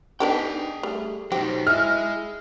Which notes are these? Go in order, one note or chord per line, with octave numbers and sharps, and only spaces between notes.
B3 D4 D#4 G4 G#4 G5
G3 A3
F#3 D#4 G4 C5
E4 G#4 D#5 F6